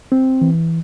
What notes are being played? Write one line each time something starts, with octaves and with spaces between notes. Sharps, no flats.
C4
E3